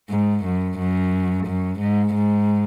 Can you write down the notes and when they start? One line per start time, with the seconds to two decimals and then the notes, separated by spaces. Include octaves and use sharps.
0.11 G#2
0.45 F#2
0.79 F#2
1.46 F#2
1.80 G#2
2.14 G#2